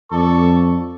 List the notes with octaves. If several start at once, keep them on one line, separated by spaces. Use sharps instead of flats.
F2 A4 D5 C#6